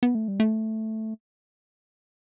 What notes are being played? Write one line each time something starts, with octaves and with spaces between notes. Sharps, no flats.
B3
A3
G3
A3